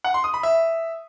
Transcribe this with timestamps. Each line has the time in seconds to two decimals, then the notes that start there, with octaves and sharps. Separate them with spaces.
0.04 F#5
0.14 C6
0.24 D#6
0.34 B5
0.43 E5